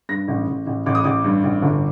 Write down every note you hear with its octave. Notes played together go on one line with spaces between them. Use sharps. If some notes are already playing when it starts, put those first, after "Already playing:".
G2 A#6
A1
A1
A1
A1 D6
D#6
A1 D6
G2
A1
G1